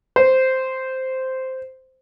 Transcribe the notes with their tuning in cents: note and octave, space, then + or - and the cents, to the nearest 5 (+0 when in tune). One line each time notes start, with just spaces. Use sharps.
C5 -5